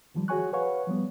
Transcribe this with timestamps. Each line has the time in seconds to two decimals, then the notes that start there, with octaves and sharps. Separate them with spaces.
0.15 C#2 D#3 F3 G3
0.28 F#4 G#4 C#5 G#5 C#6 F#6
0.53 B4 C#5 F5 F#5 C#6
0.87 F3 G3 B3